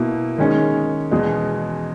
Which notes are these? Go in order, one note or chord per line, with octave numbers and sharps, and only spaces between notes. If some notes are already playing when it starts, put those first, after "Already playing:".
Already playing: B2 A#3 E4
D#3 G#3 C#4
E2 B2 G#3